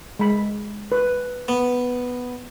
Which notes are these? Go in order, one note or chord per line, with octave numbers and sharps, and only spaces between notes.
G#3 B5
B4
B3